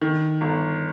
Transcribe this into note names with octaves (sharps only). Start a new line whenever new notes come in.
D#3
G1